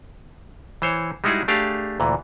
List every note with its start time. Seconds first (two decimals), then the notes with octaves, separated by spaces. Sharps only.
0.82 E3 C5 C#5
1.24 G3 G#3 D#4 E4 F#4 G#4
1.48 A3 D4 G4 G#4 F5
2.00 D2 A#2 E3